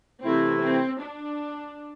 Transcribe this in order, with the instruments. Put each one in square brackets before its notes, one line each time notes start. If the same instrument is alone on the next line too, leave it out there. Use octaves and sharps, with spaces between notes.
[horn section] C3 E3 A3 E4 [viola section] C4
[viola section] C4
D4